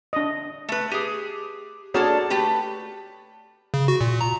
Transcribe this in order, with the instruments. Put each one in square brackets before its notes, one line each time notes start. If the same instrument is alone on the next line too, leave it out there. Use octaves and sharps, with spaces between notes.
[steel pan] D4 D#5
[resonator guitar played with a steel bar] A3 B4
G4 G#4
[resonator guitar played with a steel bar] A#3 D4 A4 [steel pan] F#4 G#4 C#5
[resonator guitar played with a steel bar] A3 G4 B4
[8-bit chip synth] C#3
F#4
A#2
A#5